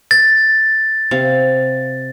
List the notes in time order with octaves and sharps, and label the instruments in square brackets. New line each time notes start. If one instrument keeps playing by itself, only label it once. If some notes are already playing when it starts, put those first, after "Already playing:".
[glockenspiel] A6
[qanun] C3 F5